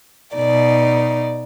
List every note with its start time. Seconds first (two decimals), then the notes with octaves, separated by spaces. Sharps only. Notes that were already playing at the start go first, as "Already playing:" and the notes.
0.36 B2 D#4 D5